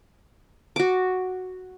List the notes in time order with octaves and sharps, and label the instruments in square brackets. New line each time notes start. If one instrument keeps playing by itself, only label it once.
[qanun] F#4 D6